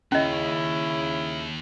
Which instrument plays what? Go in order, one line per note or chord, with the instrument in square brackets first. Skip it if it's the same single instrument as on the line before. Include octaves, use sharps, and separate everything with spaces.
[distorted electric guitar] D#2 [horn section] C#3 E4 [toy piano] C#4 D#5